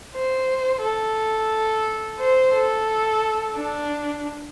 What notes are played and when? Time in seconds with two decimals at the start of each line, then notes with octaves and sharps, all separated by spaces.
0.15 C5
0.82 A4
2.19 C5
2.54 A4
3.56 D4